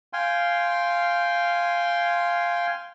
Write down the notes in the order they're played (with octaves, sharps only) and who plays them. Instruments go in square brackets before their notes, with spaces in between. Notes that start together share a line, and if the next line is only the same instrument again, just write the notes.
[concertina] F5 G5 G#5 C6